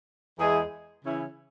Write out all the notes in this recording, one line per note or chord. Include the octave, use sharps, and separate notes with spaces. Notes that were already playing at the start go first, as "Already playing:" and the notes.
E2 E3 G#3 E4 G#4
C#3 E3 C#4 E4